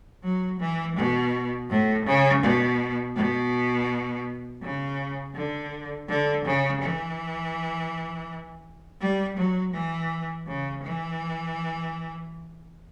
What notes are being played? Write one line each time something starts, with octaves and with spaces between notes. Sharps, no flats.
F#3
E3
B2
A2
C#3
B2
B2
C#3
D3
D3
C#3
E3
G3
F#3
E3
C#3
E3